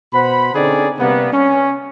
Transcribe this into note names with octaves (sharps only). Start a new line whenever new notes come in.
B2 C5 F#5 B5
D3 C4 C#4 D#4 G#4 D5
C3 G3 A#3 B3
C#4